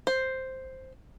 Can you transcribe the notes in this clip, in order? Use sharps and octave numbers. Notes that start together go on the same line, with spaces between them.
C5